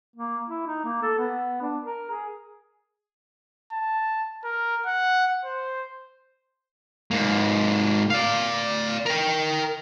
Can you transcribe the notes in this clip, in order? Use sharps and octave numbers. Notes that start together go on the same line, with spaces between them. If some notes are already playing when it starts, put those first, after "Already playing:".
A#3
E4
D#4
A#3
A4
B3
D4
A#4
G#4
A5
A#4
F#5
C5
G#2 A#3
D5 F5
A#4 G5